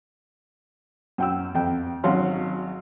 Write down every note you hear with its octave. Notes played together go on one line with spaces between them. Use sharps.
F#2 G5 E6
F2 G5
G#1 F#3 C#4 F5 C6